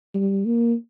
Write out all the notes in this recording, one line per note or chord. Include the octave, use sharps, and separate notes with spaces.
G3
A#3